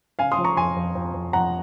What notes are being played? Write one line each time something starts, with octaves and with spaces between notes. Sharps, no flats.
C#3 F5 G#5
C6 D#6
F3
A#5 C#6
F2 G#5 C6
F2
F2
F2
F2 F#5 A#5